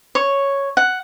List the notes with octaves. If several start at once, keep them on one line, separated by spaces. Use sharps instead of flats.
C#5
F#5